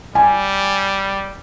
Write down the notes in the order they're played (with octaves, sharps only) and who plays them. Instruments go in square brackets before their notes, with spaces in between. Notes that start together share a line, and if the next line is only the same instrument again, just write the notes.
[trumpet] G3 [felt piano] G#5